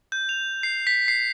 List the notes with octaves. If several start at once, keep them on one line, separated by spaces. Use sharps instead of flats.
G6
F7
C7
B6
C7